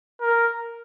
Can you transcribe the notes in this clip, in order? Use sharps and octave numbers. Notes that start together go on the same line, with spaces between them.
A#4